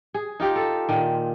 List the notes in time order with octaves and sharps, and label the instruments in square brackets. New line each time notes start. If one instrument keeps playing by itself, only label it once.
[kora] G#4
D#4 F4 G4
A4
A#2 D#3